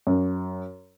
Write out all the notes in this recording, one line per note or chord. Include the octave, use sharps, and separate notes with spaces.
F#2